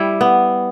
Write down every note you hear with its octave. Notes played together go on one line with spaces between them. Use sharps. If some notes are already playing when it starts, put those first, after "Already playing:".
Already playing: G3 E4
B3